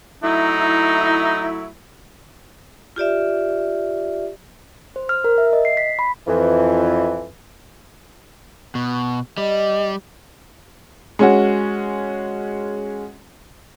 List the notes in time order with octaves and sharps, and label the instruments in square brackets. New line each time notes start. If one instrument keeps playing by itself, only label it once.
[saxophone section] F#3 A3 E4 [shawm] D#4
[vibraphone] F4 G4 D5 E5
[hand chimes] C5
F6
A#4
E5
D#5
C7
B6
B5
[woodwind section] F2 E3
[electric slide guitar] B2
[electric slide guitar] G3 [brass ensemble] D#5
[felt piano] G#3 C#4 F#4